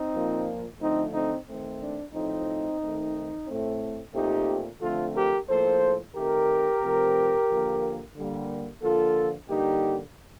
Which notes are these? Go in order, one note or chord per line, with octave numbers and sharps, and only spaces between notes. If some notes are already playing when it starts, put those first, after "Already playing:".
Already playing: C4 D#4
A#2 F3 A#3
D3 F3 A3 C4 D#4
C4 D#4
D#3 A3 C4
D4
A2 F3 A3 C4 D#4
D#3 A3 C4
A2 A3 C4
A#2 A3 C4 D#4 G4
D3 F3 A3 C4 F4 A4
G4 A#4
A2 F3 A#3 A4 C5
D#3 A3 C4 G4 A#4
C3 F3 A3 C4
D3 F3 A#3
D3 G3 A#3
D3 F3 A#3 F4 A4
D3 G3 A#3 D#4 G4